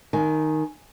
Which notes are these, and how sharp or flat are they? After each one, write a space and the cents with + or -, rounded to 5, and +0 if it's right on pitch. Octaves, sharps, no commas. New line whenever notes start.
D#3 +0 G#5 +20